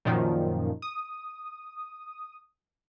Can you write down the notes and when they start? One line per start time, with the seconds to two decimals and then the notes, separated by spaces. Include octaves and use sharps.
0.05 F#2 A#2 D#3 F3
0.82 D#6